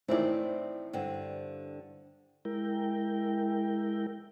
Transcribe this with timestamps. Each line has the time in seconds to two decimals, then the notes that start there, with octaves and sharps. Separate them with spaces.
0.08 A2 D#3 E3 C4 E4 D5
0.93 G2 D3 C4
2.45 G#3 E4 A#4 G5